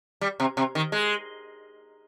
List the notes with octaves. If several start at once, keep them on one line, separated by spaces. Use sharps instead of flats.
G3
C3
C3
D#3
G#3